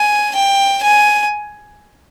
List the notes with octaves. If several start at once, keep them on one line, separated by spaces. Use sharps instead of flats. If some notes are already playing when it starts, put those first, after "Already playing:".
Already playing: G#5
G5
G#5